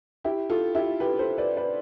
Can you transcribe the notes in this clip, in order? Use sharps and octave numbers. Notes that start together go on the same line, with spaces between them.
E4 G4
F4 A4
E4 G4
G4 B4
A4 C5
B4 D5
B4 D5